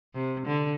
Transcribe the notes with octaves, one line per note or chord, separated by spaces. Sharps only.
C3
D3